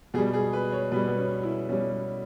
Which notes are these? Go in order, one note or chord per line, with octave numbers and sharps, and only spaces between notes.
B2 G3 G#4
G#4
B4
C#5
B2 G3 B4
B3
C#4
E4
B2 G3 C#4